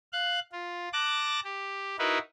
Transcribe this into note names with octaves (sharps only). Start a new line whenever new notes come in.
F5 F#6
F4
A5 D6 F#6 A#6
G4
D#4 E4 F#4 A#4 B4